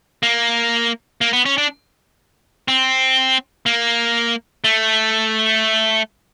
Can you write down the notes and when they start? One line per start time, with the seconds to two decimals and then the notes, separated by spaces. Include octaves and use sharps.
0.23 A#3
1.21 A#3
1.33 B3
1.46 C#4
1.58 D4
2.68 C4
3.66 A#3
4.64 A3